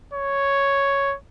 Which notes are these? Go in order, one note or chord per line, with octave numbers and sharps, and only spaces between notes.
C#5